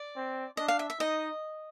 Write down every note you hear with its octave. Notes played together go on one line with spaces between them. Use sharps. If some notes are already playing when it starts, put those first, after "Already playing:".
Already playing: D5
C4
D4 D#5
F5
E5
E5
D#4 D#5